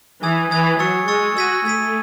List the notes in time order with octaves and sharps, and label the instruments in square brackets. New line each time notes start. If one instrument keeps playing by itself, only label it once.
[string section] E3 [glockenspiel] G#5 D#6 G#6
[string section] E3 [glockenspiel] G#5 D#6 G#6
[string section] F#3 [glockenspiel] C#6 E6 A6 C#7
[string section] G#3 [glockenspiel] C#6 E6 A6 C#7
[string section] F#4 [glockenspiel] E6 G#6 B6 D#7
[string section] A3 [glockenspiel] E6 G#6 B6 D#7